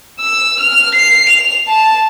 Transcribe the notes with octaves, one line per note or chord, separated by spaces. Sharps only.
E6
F6
C7
F7
A5